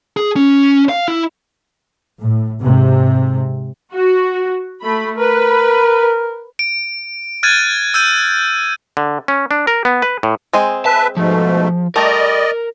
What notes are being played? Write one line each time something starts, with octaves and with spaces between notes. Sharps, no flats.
G#4
C#4
F5
E4
A2
G#2 C3
F#4
A3 B5
A#4 B4
D7
F6 F#6 G#6 A6 D#7
E6 G6 D#7
D3
C#4
D4
A#4
B3
B4
A2
G#3 C4 G#4
B4 E5 A5
G#2 B2 F3 A3
G3 A3 A#4 D5 D#5